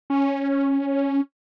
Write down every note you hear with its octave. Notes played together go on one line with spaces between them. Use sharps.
C#4